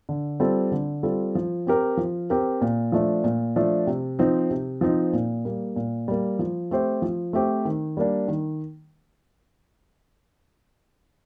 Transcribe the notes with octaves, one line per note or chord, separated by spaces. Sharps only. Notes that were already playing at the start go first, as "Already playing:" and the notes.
D3
G3 C4 F4 A4
D3
G3 C4 F4 A4
F3
C4 G4 A#4
F3
C4 G4 A#4
A#2
F3 A3 D4
A#2
F3 A3 D4
C3
F3 C4 D#4
C3
F3 C4 D#4
A#2
G3 A#3
A#2
G3 A#3
F3
A3 C4 G4 C5
F3
A3 C4 G4 C5
D#3
G3 A#3 D4
D#3